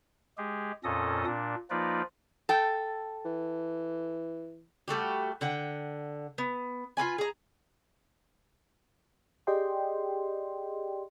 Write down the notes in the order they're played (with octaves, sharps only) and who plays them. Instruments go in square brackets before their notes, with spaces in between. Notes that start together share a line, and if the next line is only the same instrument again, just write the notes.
[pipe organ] G#3 G4 G#4
F2 A#2 C#4 A4 D#5 D#6
A#2 D4
F3 A#3 D#4 F4 B4 D5
[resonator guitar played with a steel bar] A4 G5
[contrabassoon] E3
[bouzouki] G3 A3 F#4 G4
D3 F#5 G5
B3
F4 F#4 B4 G#5
G#4 A#5
[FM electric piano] G4 G#4 D5 D#5 G5 C6